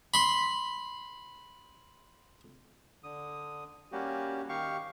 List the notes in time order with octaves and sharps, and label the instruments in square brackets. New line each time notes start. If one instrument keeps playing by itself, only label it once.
[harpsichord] B5 C6
[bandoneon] D3 D#6
G3 A#3 C#4 F#4 G4
D#3 G4 F5 C#6